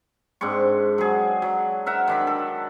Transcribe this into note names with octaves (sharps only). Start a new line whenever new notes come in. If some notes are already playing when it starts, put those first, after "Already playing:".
G#2 C4 D4 C#6
F#3 G#4
F#3
A#4 E5 F#5
D#3 D4 B5
A4